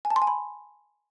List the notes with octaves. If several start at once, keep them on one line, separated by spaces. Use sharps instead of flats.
G#5
A5
C6
G#5
B5